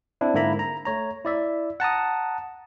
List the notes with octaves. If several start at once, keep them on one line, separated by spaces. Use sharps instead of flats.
C4 D4 E4
G#2 D3 A#3 E4 A#5 B5
A#5
A3 C#5 A#5
E4 D5 E5
F#5 A5 A#5 D#6